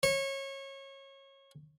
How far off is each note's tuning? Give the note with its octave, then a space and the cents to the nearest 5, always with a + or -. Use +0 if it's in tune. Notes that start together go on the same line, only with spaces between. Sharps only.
C#5 -25